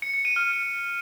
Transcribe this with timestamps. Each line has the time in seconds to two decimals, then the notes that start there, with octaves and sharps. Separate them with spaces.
0.02 C#7
0.14 C#7
0.25 D#7
0.36 F6